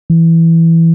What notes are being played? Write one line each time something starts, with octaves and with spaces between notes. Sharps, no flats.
E3